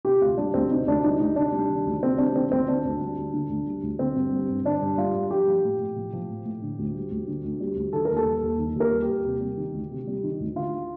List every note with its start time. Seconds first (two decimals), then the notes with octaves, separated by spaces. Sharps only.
0.05 C3 G4
0.22 D2 F4
0.37 G3 D4
0.54 D2 C4
0.70 C3 D#4
0.88 D2 D4
1.04 G3 D#4
1.20 D2 D#4
1.36 C3 D4
1.52 G3
1.70 D#3
1.86 D2
2.02 C3 C4
2.18 G3 D4
2.35 D#3 C4
2.52 D2 C4
2.67 D3 D4
2.85 D2
3.01 G3
3.18 D2
3.34 D3
3.49 D2
3.66 G3
3.83 D2
3.99 D3 C4
4.15 G2
4.32 G3
4.49 G2
4.64 D3 D4
4.82 G2
4.98 G3 F4
5.14 G2
5.31 F3 G4
5.48 F3
5.64 A2
5.80 A2
5.96 F3
6.13 F3
6.30 A2
6.46 A2
6.62 D3
6.79 D2
6.94 G3
7.11 D2
7.28 D3
7.44 D2
7.60 G3
7.77 D2
7.93 D#3 A4
8.05 D#2 A#4
8.17 A4
8.26 G3
8.43 D#2
8.59 D#3
8.76 D#2 A#4
8.92 G3
9.02 G4
9.09 D#2
9.25 C3
9.41 G3
9.57 D#3
9.74 D2
9.91 C3
10.07 G3
10.24 D#3
10.40 D2
10.56 D3 F4